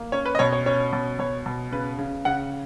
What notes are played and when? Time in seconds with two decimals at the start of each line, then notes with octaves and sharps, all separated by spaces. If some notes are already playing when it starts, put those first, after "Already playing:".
Already playing: A#3
0.12 C#4 C#5
0.25 B4
0.35 D#5
0.39 B2 C#5
0.52 C#5
0.66 C#4 C#5
0.92 B2
1.19 B2 C#5
1.46 B2
1.72 C#3 B4
1.98 C#3
2.25 C#3 F#5